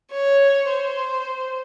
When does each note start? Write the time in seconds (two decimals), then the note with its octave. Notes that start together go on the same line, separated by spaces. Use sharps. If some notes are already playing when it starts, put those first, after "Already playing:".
0.11 C#5
0.69 C5